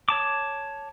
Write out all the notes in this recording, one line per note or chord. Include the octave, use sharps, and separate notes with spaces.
C#5 A5 D6